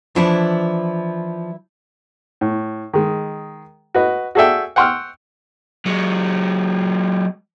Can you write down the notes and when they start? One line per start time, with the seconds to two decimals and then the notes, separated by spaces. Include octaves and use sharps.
0.16 E3 F3 D4 E4
2.41 A2
2.94 D#3 G#3
3.94 F#4 B4 D#5
4.35 F#4 G#4 A4 D5 E5 G5
4.76 F#5 G5 C6 C#6 E6 F6
5.86 F#3 G#3